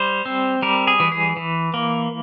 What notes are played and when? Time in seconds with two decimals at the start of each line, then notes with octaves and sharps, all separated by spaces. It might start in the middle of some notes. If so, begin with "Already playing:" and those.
Already playing: G3 C5
0.26 C4
0.62 G3 A#4
0.87 G#4
1.00 E3
1.12 G#4
1.37 E3
1.74 A#3